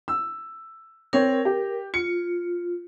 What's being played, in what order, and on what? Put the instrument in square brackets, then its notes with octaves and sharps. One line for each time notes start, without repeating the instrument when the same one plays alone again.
[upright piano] E6
[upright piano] C4 C#5 [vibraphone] A#4
[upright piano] G4
[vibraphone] F4 [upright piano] C#7